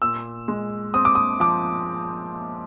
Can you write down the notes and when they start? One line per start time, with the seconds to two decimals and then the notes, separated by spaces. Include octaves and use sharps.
0.02 A#2 E6
0.48 G#3
0.94 C4 D#6
1.05 D6
1.15 D#6
1.40 F3 D6